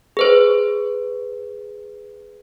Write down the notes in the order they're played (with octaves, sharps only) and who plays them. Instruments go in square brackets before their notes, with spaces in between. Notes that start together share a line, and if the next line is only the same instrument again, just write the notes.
[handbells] G#4 B4 C5